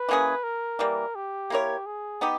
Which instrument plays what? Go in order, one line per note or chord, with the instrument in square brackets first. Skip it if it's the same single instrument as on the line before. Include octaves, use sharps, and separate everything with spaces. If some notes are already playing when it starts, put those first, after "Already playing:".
Already playing: [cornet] B4
[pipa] E3 A#3 C#4 G#4
[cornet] A#4
[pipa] E3 G3 A#3
[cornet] G4
[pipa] A#3 E4 A#4 C#5
[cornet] G#4
[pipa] B3 D#4 G4